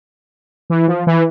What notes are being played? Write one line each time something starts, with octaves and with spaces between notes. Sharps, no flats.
E3
F3
E3